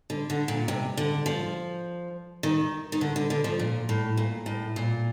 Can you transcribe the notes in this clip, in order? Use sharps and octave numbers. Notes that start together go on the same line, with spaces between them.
D3
D3
A#2
C3
D3
F3
D#3
D#3
D3
D3
D3
F3
A#2
A2
A#2
A2
A#2